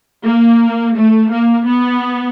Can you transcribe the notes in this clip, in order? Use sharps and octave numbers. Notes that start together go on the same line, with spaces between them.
A#3
A3
A#3
B3